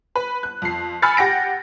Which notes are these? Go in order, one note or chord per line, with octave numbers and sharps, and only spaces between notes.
B4
F#6
F2 C7
G#5 B5 E6 F6 A6 C#7
G4 F#5 A#6 D7